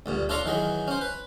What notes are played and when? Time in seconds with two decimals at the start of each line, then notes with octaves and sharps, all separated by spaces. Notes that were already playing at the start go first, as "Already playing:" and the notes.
0.06 D2 G2 A#2
0.29 D4 F4 A4 C#5 A#5 C6
0.46 D#3 E3 F#3 G#4
0.88 C#4 C5
1.01 B4